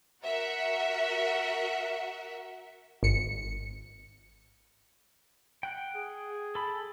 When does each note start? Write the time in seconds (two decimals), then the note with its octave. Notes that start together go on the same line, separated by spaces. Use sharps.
0.23 F#4 A#4 E5 F#5
3.03 G#1 C#7
5.63 F#5 G5
5.96 G#4
6.55 A4 B5